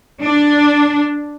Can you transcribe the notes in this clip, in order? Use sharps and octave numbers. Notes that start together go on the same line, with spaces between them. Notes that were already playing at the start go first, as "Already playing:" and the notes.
D4